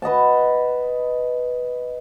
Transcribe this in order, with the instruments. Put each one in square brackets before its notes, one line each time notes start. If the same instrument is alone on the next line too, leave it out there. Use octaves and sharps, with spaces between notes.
[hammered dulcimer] B4 D#5 F#5 A5